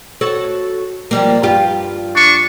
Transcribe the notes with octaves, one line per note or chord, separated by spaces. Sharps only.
F#4 A4 C#5
F3 G3 A#3
G2 F4 G4
D4 C#6